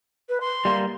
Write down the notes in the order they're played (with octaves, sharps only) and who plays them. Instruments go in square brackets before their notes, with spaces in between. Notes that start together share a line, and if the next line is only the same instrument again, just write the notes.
[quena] B4
C6
[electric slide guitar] G3 A#3